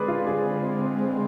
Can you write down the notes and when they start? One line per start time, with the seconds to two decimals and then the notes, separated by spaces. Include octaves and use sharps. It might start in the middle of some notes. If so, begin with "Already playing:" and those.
Already playing: D3 G#3 C4 G#4 B4 D5
0.08 F4
0.27 G#4